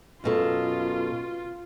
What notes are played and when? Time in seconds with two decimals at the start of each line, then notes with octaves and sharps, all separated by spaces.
0.24 F#2 B2 F4 A4